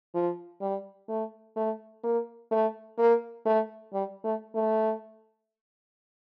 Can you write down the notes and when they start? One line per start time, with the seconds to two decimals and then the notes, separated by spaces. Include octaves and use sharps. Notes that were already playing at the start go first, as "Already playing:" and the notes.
0.14 F3
0.61 G3
1.08 A3
1.56 A3
2.03 A#3
2.51 A3
2.98 A#3
3.45 A3
3.93 G3
4.24 A3
4.55 A3